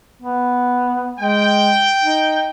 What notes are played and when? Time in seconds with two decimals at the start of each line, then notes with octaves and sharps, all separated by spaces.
0.22 B3
1.19 G#3 G5
2.03 D#4